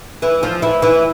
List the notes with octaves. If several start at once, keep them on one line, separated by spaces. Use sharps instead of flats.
E3 E4
F3 F4
E3 E4
E3 E4